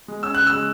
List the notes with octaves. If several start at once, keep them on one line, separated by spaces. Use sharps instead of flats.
G#3
C#4 E6
C#3 F#6
E6
G#3